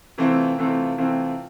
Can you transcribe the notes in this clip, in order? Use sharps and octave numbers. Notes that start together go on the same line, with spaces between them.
C3 E3 A3 C4 F4
C3 E3 A3 C4 F4
C3 E3 A3 C4 F4